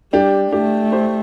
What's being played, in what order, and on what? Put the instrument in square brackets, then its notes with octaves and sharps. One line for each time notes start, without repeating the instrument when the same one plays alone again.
[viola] G3 [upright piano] D4 G4
[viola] A3 [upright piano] D4 G4
[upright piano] G4 C5